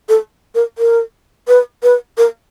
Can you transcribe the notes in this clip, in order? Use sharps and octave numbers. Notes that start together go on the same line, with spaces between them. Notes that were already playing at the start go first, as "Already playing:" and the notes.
A4
A#4
A#4
B4
B4
A#4